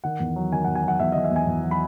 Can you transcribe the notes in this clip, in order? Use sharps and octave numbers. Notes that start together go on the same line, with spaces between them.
D#3 F#5
E2
F#3
D#3 G#5
E2 F#5
G#5
F#3 F#5
E2 E5
D#3 D#5
E5
E2 G#5
E2
F#3
B5